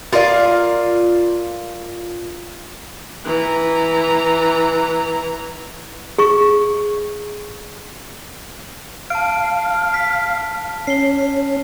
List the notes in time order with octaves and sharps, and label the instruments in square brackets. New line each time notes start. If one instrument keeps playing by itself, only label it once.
[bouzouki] F4 A#4 D5 F5
[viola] E3 A#5
[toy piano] G#4 C#6
[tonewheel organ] F5 [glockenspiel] A5 D7
[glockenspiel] B6
[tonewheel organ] C#4 [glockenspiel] C7 G7